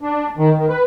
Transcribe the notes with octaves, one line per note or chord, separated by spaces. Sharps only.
D4
D#3
D#3
B4